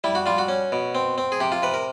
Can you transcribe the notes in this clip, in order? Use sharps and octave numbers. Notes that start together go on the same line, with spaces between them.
G3 E4
F#4
G3 F4
F#4
C#4
B2
C4
C4
G#4
C3 G4
F4
C3 B4
A#4